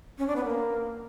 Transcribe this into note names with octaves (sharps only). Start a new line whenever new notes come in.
C#4
D4
B3
A#3